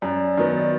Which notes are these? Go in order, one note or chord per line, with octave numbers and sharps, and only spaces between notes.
F#2 D5
D#3 F#3 B3